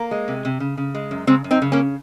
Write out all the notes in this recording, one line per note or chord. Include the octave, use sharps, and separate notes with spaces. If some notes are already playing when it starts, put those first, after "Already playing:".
Already playing: A#3
G#3
C3
C3
C#3
C#3
G#3
F#2
C#3 G#3 C4
F#2
C4 D#4
C#3
A#3 C#4